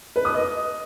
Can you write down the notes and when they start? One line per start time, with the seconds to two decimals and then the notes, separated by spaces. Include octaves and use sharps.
0.16 B4
0.25 D#6
0.34 D#5